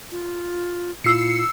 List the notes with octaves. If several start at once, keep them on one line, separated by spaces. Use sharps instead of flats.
F4
A#2 E4 F4 E6 C7 C#7